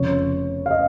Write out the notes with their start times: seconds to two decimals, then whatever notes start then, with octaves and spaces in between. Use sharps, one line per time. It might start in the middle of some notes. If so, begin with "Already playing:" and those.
Already playing: F1 F2 C#3 C#5
0.66 F5
0.71 D#5